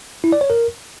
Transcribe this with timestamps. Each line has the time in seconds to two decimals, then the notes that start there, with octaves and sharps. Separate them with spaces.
0.24 E4
0.32 D5
0.41 C#5
0.50 A#4